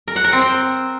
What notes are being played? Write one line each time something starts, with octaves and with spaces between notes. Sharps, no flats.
A#4
F#5
A#4
C4
C5